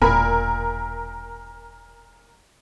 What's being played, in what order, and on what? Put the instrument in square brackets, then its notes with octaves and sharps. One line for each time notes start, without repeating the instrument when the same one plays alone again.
[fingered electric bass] E1 [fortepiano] A#2 B5 [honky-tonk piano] A#4